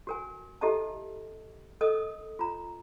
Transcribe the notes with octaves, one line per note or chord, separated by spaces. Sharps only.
F#4 A#4 G#5
E4 G4 A4 D#5 E5 A5
A4 A#4 D#5 D#6
F4 A#5